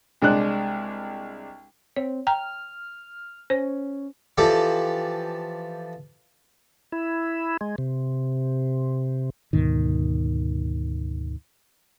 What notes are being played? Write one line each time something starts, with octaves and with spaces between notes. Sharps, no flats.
C2 G#3 D4 F#6
C4 C#5
G5 A#5 F6
C#4 C5
E3 F3 G4 A4 D5
E4
G#3
C3
D2 G#2 B2 D#3